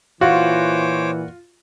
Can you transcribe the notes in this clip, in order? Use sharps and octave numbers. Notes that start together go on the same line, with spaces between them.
A#2 E3 F4 F#4 C5 C#5 D6